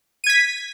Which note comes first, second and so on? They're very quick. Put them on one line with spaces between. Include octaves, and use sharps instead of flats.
D#7 G#6 B6